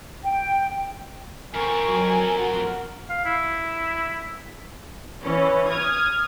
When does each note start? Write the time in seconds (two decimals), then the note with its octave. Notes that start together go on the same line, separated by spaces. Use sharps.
0.24 G5
1.54 F2 C4 A#4 G#5 C#6
1.88 F#3 G#5
2.39 D1 F#4
3.10 F5
3.25 E4
5.23 E3 C#4
5.69 D#6 F6 G#6